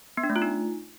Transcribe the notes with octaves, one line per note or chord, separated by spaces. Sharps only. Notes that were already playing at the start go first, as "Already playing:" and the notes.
B3
D4
A3
F4
D#4